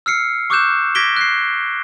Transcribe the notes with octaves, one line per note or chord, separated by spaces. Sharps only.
E6 F6 C7 C#7
C#6 D6 E6 F#6 G6 E7
D6 G#6 A#6 B6 D7 G7
F#6 C7